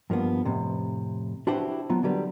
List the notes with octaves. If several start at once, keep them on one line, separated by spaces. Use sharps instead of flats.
G2 F3 A#3 B3
F2 A2 C3
D4 E4 F#4 G4 B4 C5
F#3 B3 F4
D3 F#3 G3 B4